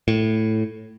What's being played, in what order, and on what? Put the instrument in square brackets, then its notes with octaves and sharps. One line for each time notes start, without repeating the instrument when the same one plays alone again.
[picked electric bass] A2